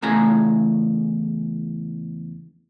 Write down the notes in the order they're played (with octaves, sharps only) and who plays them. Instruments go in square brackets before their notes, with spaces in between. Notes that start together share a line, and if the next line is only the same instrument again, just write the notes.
[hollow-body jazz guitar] E2 C#3 A3 F4 G#5 A#5